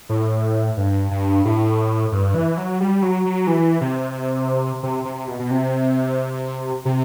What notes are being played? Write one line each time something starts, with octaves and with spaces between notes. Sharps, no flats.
A2
G2
G2
A2
G2
E3
F#3
G3
F#3
F#3
E3
C3
C3
C3
B2
B2
C3
C3